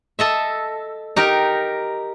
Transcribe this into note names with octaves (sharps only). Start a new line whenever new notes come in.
A4 D#5 E5
D#4 G4 A#4